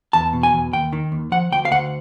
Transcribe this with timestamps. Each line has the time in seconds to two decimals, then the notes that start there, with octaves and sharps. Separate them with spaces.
0.13 E2 A5
0.33 B2
0.43 G#5
0.53 E2
0.73 D#2 G5
0.93 D#3
1.12 D#2
1.32 F3 F#5
1.52 D2 G5
1.65 F5
1.71 D2 F#5